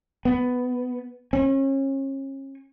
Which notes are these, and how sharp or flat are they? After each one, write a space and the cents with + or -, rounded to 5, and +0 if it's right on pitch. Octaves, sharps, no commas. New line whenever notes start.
B3 +10
C#4 -35